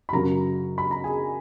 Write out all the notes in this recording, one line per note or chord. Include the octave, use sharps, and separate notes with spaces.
B5
F#2 C#3 F#3 A#4 A#5
B5
A#5
G#4 G#5